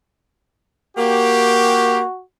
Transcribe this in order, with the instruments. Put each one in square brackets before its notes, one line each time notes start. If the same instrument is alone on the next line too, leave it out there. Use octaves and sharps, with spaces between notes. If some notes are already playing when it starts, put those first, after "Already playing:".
[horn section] A#3 G4 [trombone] F#4